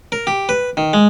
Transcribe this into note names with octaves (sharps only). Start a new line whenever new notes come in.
A#4
G4
B4
D#3
G#3